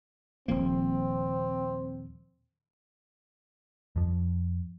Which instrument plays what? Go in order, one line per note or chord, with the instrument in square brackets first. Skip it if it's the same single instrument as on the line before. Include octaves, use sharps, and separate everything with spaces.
[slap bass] D#1 F3 A#3 [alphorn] C4
[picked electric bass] F2 F3